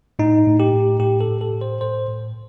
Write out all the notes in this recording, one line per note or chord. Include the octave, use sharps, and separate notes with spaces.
A2 D#4
A2
G4
A2
A2 G4
A4
A2
A4
A2
C5
A2 C5
A2